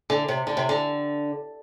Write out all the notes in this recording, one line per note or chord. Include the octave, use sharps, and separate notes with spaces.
D3
C3
D3
C3
D3